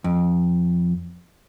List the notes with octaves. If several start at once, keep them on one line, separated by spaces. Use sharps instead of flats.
F2